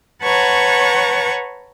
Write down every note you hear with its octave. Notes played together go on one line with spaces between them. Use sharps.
B4 C#5 F#5 A5 A#5 C#6